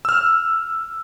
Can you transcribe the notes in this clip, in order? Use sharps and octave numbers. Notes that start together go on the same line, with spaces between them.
E6 F6